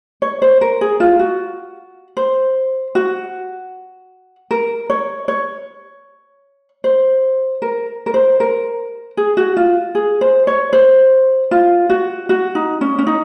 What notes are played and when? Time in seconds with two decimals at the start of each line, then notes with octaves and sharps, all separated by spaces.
0.22 C#5
0.42 C5
0.61 A#4
0.81 G#4
1.00 F4
1.19 F#4
2.17 C5
2.95 F#4
4.51 A#4
4.90 C#5
5.28 C#5
6.84 C5
7.62 A#4
8.06 A#4
8.14 C5
8.40 A#4
9.17 G#4
9.37 F#4
9.57 F4
9.95 G#4
10.21 C5
10.47 C#5
10.73 C5
11.51 F4
11.90 F#4
12.29 F#4
12.55 D#4
12.81 C#4
12.99 C#4
13.07 D#4